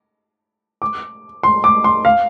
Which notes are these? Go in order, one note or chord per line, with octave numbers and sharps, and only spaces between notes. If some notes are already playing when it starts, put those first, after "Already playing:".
D6
C6
D6
C6
F5